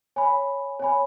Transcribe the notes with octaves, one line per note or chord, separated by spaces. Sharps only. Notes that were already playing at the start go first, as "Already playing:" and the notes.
C#5 G#5 B5
C#5 G#5 B5